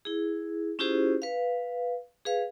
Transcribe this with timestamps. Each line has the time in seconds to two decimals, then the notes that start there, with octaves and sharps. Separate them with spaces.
0.05 E4 G#4
0.79 C#4 E4 F4 G4 G#4 C5
1.22 B4 F5
2.25 G#4 B4 F5